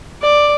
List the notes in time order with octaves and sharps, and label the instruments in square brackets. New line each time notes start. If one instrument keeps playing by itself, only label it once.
[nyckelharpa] D5